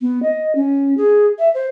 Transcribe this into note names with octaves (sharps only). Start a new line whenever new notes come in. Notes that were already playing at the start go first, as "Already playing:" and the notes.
B3
D#5
C#4
G#4
E5
C5